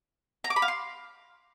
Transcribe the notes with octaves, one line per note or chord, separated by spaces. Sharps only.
A#5
D6
B5
F5
C6